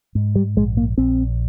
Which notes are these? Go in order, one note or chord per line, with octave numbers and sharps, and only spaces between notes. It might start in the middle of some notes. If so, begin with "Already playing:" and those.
G#2
G3
A#1 G#3
A#3
A#1 C4